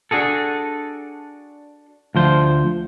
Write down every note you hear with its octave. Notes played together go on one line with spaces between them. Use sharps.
D4 F#4 G#4 A4
D2 F3 C5